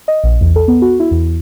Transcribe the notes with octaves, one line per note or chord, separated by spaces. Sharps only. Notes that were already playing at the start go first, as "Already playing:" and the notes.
D#5
A#1
E2
A4
B3
F#4
E4
E2